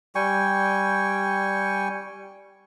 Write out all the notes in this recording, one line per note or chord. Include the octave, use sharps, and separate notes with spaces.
G3 G5 G#5 C#6